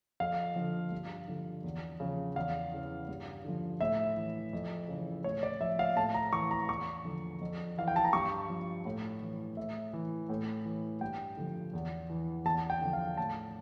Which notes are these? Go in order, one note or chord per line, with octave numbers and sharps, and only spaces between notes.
F2 F5
D3 F3
G2
D3 F3
E2
C#3 F3
E2 F5
C#3 E3
G2
D3 F3
A2 E5
E3
F2
C#3
E3
A2 C#5
D5
F3 E5
F5
A2 A5
A#5
E3 C#6
A#5
E2 C#6
D3 F3
F2
E3 F5
G5
A5
A#5
G2 C#6
F3
A2
E3
A2 E5
E3
A2
E3
G2 G5
D3 F3
E2
E3
E2 A5
G5
D3 F3
F5
A2 A5